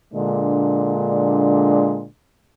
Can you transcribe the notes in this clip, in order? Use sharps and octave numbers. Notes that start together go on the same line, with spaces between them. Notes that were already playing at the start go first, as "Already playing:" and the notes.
A#2 D3 G#3 D4